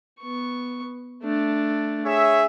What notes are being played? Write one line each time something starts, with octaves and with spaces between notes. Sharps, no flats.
B3 C#6
A3 D4
G#4 C#5 E5